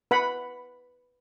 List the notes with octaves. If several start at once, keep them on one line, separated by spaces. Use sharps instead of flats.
B4 F#5 B5